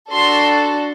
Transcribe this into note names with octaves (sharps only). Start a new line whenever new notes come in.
D4 F#4 A4 C6